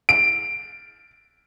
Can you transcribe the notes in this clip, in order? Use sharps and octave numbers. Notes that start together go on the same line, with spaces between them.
D7